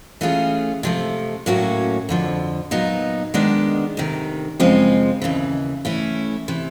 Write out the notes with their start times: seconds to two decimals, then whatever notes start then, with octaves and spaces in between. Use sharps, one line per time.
0.21 E3 A3 C#4 F4 G#4
0.83 C3 F3 A3
1.46 A2 F#3 A#3 C#4 F#4
2.09 F2 D3 F3
2.71 A#2 F#3 B3 D#4
3.34 D#3 G#3 B3 D4
3.97 D2 C3 D#3
4.60 F#2 C#3 F3 G#3 C4
5.22 D#2 C#3 E3
5.85 E3 A3 C#4 E4
6.48 C3 E3